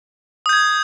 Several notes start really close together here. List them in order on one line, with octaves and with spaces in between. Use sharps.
D#6 G6 G#6